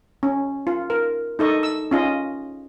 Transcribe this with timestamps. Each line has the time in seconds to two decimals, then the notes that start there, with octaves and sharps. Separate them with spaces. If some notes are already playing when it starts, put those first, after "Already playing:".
0.23 C#4
0.67 F4
0.90 A#4
1.39 D#4 A4 D#5 C#6
1.63 E6
1.91 C#4 F4 D#5